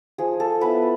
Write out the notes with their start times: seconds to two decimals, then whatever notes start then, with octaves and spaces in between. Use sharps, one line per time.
0.18 F3 G#4
0.40 A4
0.61 B3 E4 B4